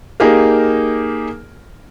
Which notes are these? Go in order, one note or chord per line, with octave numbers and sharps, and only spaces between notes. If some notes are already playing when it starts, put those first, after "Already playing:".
A#3 D#4 G4 G#4 A#4